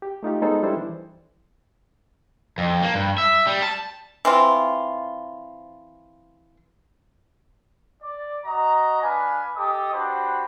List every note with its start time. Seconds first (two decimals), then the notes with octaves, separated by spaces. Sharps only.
0.02 G4
0.23 A3 D#4 F4 G4
0.42 G#3 B3 D#4 G#4 A4 C5
0.63 G3 D4 E4 A4 C5
0.77 E3
2.58 F2
2.83 A#3
2.95 G2
3.18 E5
3.47 G3
3.62 A5
4.25 E3 C4 F4
8.02 D5
8.45 F#4 D#5 A#5
9.02 D4 B4 D5 F5 G#5
9.56 G4 A4 D#5 D6 D#6
9.93 D4 F#4 G4 B4 C5